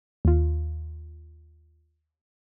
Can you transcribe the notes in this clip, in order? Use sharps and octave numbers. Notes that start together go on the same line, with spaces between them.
D#2 F4